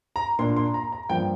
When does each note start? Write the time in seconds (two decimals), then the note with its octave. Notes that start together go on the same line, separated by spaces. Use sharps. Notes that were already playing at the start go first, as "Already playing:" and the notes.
0.16 A#5
0.39 A#2 A#3 D4 C6
0.56 C6
0.74 A#5
0.92 A#5
1.09 G2 F3 A#3 G5